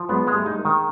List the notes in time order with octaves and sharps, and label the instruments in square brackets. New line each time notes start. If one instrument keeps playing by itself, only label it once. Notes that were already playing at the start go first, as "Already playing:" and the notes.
Already playing: [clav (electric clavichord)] F3
[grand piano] F#3 G#3 [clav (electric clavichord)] B3
[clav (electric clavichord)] G#3
[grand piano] G3 A3
[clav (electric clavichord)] D#4
[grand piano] G#3 A#3
[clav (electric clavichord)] D#3